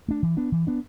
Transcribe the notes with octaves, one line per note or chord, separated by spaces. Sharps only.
A3 D4
E3
B3 D4
E3
B3 D4